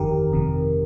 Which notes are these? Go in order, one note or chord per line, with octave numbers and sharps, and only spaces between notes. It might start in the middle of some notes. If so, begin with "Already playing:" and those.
Already playing: G1 F2 D#3 G4 A#4
G1 F2 C3 D#3